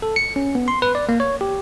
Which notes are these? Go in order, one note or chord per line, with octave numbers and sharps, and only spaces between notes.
A4
C#7
C#4
B3
C6
B4
D5
A#3
C#5
G4